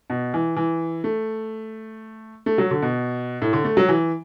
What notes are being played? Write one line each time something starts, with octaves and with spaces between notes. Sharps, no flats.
B2
E3
E3
A3
A3
F#3
D3
B2
A2
D3
A3
F#3
E3